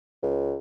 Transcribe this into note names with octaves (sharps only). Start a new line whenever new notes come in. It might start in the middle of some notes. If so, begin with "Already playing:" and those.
C#2